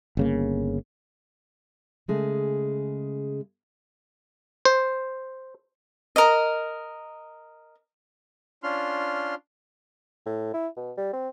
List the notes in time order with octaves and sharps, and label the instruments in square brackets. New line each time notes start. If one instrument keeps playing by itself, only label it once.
[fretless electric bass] G1 C#3 A#3
[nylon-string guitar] C#3 G#3 A3
[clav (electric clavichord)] C5
[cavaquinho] A#4 D#5
[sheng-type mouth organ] C#4 D4 F4 C6 F6
[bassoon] A2
E4
B2
G3
C4